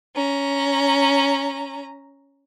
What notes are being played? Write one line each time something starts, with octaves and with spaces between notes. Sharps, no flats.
C#4 A#5